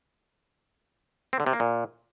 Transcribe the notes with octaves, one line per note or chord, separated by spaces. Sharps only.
C4
D3
C3
A#3
A#2